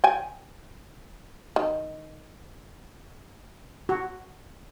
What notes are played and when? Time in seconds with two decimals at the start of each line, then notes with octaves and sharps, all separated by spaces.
0.04 G5 G#5
1.56 D#3
3.89 F#4